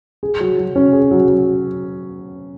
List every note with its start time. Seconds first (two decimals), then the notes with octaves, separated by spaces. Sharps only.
0.23 G#4
0.40 F#3
0.58 F#3
0.76 C#4
0.93 G#4
1.11 F#3
1.28 F#3